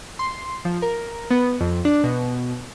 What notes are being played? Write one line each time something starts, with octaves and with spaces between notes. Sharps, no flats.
C6
F3
A#4
B3
F2
D4
B2